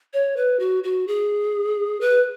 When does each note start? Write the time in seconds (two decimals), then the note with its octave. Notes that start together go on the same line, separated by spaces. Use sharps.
0.13 C#5
0.37 B4
0.60 F#4
0.84 F#4
1.08 G#4
2.01 B4